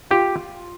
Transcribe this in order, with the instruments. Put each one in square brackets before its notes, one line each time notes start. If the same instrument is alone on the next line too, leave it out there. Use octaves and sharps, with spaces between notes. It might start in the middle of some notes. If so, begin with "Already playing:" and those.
[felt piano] F4 [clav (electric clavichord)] G4